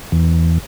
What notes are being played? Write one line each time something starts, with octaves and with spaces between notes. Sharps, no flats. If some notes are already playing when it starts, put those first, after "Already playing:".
E2